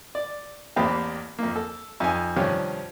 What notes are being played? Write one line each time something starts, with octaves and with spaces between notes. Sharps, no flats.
D5
A1 E2 A#3 C4 G4
F2 A#3
A4
F2 D#4 G#5
G2 C3 D#3 F3 C#4 F4